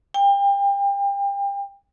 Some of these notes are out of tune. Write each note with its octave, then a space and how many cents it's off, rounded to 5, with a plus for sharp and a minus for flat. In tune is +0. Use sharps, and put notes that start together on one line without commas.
G5 +35